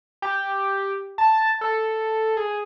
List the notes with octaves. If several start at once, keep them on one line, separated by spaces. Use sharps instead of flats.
G4
A5
A4
G#4